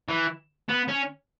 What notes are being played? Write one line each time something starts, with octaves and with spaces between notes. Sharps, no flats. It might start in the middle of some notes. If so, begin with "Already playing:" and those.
E3
B3
C#4